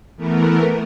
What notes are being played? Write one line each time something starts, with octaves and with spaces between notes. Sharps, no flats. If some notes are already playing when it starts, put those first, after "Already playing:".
E3 A3 B3 A#4